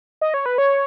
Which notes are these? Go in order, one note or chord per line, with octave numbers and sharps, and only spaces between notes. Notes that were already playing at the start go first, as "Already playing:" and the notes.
D#5
C#5
B4
C#5